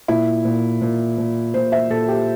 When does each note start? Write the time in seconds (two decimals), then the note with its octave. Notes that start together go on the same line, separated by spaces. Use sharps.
0.08 A#2 E4
0.45 A#2
0.82 A#2
1.18 A#2
1.54 A#2 C5
1.72 E5
1.90 A#2 A4
2.08 G4